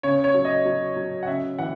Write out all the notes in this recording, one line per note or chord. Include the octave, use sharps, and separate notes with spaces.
C#3 C#5
C#5
F#3
D#5
F#3
F#3
F#5
C#3 E5
E3 F#5